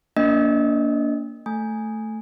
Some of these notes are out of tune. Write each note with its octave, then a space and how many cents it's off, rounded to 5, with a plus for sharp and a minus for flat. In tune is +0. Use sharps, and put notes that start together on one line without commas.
A#3 +0 D4 -30 D#5 +0
A3 +0 G#5 +0